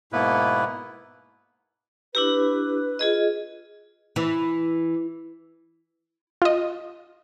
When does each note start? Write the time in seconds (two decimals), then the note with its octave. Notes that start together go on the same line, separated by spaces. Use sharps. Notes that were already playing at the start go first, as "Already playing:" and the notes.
0.13 G#2 B2 A#3 B3 E4 B4
2.15 D4 E4 G4 B4
2.99 F4 G#4 D#5
4.16 E3
6.42 F4 D#5